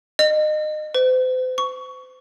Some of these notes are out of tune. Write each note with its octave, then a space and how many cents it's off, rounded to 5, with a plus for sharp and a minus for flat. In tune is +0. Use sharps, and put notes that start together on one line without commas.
D#5 -25
C5 -40
C#6 +20